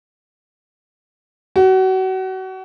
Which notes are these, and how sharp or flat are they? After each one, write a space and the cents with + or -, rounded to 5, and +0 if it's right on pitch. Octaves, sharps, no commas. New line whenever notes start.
F#4 +30